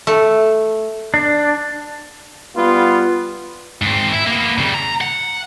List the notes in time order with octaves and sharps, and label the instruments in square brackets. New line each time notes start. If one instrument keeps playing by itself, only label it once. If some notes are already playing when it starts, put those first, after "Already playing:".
[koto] A3
[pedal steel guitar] D4
[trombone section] G3 B3 F4
[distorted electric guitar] G#2 C4
E4
A#3 B3
C#3 G3
A#5
F#5